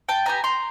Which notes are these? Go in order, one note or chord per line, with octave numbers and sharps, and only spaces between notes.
G5 A5
B3 D4 G4 G#5 A#5
A#5 C6